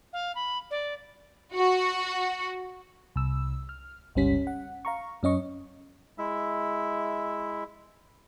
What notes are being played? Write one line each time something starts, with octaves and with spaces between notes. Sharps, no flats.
F5
B5
D5
F#4
C2 E6
F6
G1 C#2 G3 C#4 B6
F#5
F5 A#5 C#6
F#2 C#4 D#5 C#6
G#3 E4 E5